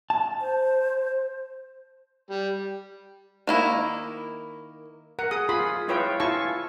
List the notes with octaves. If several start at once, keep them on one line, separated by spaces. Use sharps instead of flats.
A5
C5
G3
D#3 A#3 E4
A#4 F#5
G#4 D#6
F4 G#4 B5 C6
E4 F4 B4 C#5 E5 G5
E4 F4 G#5 A5 C#6